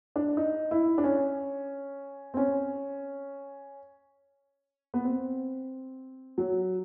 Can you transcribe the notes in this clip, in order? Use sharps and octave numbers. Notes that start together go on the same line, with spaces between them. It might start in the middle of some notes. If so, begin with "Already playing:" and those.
D4
D#4
E4
D4
C#4
C4
C#4
B3
C4
F#3